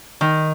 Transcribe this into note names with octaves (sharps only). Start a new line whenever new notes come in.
D#3